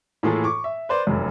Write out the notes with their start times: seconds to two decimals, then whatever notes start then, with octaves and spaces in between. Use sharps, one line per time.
0.23 A2 E3 A#3 F4 G#4 A4
0.44 C#6 D6
0.64 E5
0.89 B4 C5 D5
1.07 F1 F#2